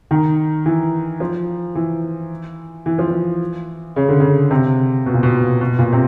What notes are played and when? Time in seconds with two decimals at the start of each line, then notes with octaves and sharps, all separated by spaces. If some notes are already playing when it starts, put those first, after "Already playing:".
0.11 D#3
0.66 E3
1.20 F3
1.75 E3
2.86 E3
2.98 F3
3.10 E3
3.96 C#3
4.08 D3
4.20 C#3
4.51 C3
5.06 B2
5.14 A#2
5.23 B2
5.61 B2
5.79 A#2
5.92 C3